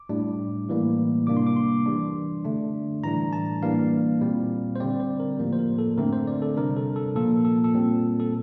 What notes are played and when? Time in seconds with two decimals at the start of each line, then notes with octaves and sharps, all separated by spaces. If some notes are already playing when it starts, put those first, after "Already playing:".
Already playing: D6
0.09 A2 G3 D4
0.68 A2 E3 G3 A#3
1.27 C3 G3 A#3 D4 D6
1.37 C6
1.47 D6
1.56 C6
1.86 E3 G3 D4
2.45 D3 A3 D4
3.04 A2 E3 G3 D4 A#5
3.33 A5
3.63 E3 G3 A#3 D4 F5
4.21 A#2 G3 C4
4.76 C5
4.80 D3 G3 C4 D5
5.00 C5
5.20 A#4
5.39 A2 F3 A#3
5.53 C5
5.59 A#4
5.79 A4
5.98 D3 A3 C4 A#4
6.13 C5
6.27 D5
6.42 A4
6.57 C3 G3 D4 A#4
6.77 A4
6.96 A4
7.15 A#2 F3 A#3 A4
7.45 A4
7.64 A4
7.75 A#2 G3 C4
8.20 A4